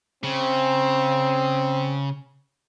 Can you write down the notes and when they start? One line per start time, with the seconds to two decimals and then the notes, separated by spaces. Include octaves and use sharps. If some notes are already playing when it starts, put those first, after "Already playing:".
0.23 C#3 C4